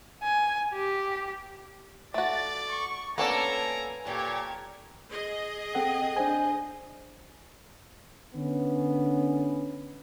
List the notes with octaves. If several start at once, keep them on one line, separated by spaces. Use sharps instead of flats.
G#5
G4
A3 F#4 D5 A6
C#6
A#3 B3 C#4 D4 A4 G#5 A#5
A#2 G4 A4 C#5 G#6
G#4 D#5
C4 A4 F#5 G5
D4 C5 G#5
D3 B3 C#4